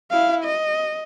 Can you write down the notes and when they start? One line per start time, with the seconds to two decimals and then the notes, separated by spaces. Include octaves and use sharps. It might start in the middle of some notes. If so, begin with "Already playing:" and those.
0.11 E4 F5
0.45 D#5